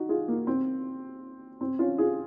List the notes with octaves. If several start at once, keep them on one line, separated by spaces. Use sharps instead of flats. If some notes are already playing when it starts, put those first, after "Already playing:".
Already playing: D#4 F#4
F4 G#4
A#3
C4
C4
C#4 F4
F4 G#4